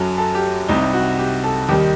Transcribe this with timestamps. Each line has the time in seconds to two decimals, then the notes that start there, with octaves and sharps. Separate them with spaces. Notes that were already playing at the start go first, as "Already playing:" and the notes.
Already playing: F#2 F#3 A4
0.18 A4
0.35 G4
0.68 C2 C3 G3 D#4
0.93 F#4
1.19 G4
1.44 A4
1.69 D#2 D#3 G3 G4